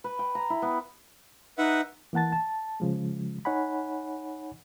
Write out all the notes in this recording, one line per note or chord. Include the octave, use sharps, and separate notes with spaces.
B4
G5
A#5
E4
B3
D#4 B4 E5 F#5
E3 A#3 F#5 A5 A6
A5
C#3 F3 G#3
D#4 C#5 F#5 G#5 B5